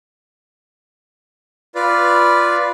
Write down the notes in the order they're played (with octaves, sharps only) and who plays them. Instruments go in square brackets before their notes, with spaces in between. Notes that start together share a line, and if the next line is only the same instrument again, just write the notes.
[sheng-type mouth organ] F4 B4 D5